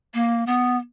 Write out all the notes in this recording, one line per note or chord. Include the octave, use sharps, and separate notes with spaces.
A#3
B3